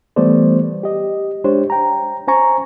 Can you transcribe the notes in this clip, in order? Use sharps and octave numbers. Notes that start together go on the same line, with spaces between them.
E3 G3 A3 B3 C5 D5
G4 D#5
G#3 D4 G4 C5 C#5
G5 A#5
C#4 C5 G#5 A#5 C#6